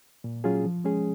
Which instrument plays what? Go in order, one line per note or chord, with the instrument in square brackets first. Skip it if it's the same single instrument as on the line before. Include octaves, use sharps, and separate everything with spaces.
[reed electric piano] A#2
F#3 C#4 F4 G#4
F3
G#3 C#4 G#4